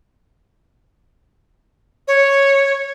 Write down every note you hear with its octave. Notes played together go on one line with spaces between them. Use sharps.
C#5